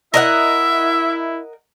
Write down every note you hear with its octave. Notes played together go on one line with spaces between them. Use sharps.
E4 A#4 D#5 E5 F#5